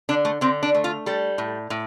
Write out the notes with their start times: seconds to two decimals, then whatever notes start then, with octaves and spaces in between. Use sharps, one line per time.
0.09 D3 D4
0.25 A3
0.41 D3 C4
0.63 D4
0.75 A3
0.84 F4
1.06 G3 A4
1.38 A2
1.70 A2